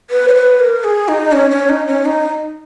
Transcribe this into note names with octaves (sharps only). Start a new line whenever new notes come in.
B4
C#5
B4
A#4
G#4
D#4
C#4
C#4
D#4
C#4
D#4